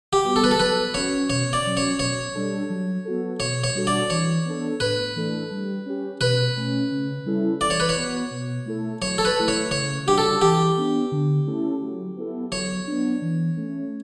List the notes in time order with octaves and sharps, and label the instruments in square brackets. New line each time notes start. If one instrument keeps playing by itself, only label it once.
[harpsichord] G4
[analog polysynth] G3 B3 F#4
[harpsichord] A4
B4
A4
[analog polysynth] F#3 [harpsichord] B4
[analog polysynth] C#4 F#4 [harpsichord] C#5
[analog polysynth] B2 [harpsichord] C#5
[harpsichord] D5
[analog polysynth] F#3 C#4
[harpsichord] C#5
[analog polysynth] B2 [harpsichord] C#5
[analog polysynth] G3 D4 A4
F#3
B3 F#4 A4
[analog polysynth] B2 [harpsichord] C#5
[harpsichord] C#5
[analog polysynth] G3 D4 F#4 A4
[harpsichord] D5
[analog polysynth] E3 [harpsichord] C#5
[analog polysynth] B3 D4 A4
[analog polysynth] A2 [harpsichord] B4
[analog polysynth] E3 A3 D4 A4
G3
C#4 G4
[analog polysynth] B2 [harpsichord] B4
[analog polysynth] A3 C#4
C#3
G3 C#4 E4 A4
[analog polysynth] E3 [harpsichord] D5
[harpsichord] C#5
B4
C#5
[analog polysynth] B3 F#4
B2
A3 E4 A4
[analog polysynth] F#3 [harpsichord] C#5
[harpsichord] A4
B4
[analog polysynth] A3 E4 A4
[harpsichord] C#5
[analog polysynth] C#3 [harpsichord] C#5
[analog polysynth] G3 D4 F#4 [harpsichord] G4
[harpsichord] A4
[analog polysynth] E3 [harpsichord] G4
[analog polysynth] B3 D4
D3
A3 C#4 E4 A4
F#3
B3 E4 A4
[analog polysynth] F#3 [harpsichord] C#5
[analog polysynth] B3 D4
E3
A3 C#4